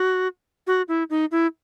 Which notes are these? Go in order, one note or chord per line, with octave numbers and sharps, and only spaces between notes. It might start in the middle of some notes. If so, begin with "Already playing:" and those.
Already playing: F#4
F#4
E4
D#4
E4